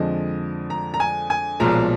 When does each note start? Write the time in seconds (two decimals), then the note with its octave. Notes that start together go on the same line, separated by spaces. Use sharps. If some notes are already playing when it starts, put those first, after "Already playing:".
Already playing: F2 D3 F3 G#3 D#5
0.70 A#5
0.94 A#5
1.00 G#5
1.30 G#5
1.60 B1 A#2 F3 G#3 A#5